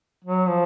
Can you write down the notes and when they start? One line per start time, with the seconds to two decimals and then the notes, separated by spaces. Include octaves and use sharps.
0.25 F#3
0.48 F3